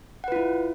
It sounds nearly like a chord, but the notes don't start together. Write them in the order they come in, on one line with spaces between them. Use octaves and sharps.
F#5 B4 F4 E4